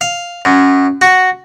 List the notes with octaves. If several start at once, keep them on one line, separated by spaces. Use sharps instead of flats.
F5
F#2
F#4